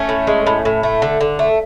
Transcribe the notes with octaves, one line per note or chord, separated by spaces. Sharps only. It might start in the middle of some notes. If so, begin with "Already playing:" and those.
Already playing: A3 C#4
A2
G#3
A2
A2
A3
D3
D3
A3